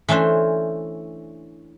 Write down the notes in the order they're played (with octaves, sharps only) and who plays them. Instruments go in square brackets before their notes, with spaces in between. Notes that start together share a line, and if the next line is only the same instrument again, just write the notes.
[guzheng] E3 A3 C#4 D4 C5